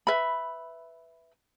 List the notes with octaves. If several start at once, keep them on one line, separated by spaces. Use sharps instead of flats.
B4 E5 B5